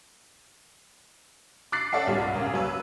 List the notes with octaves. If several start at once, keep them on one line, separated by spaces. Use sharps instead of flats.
D6 F#6 A6 C7
C#4 A4 D5 E5 F#5 A5
C2 G2 A#2 G3
C#2 C#3 A#3
F#3 B4 E6